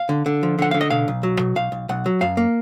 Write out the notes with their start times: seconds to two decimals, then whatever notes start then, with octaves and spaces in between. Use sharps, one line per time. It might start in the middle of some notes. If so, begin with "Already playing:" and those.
Already playing: F5
0.09 D3
0.26 D3
0.43 F3
0.59 D3 F#5
0.71 D3 F5
0.81 D#5
0.90 B2 F5
1.08 B1
1.23 F#3
1.39 B2
1.56 B1 F5
1.72 B1
1.89 B1 F#5
2.06 F#3
2.21 F#2 F5
2.37 A#3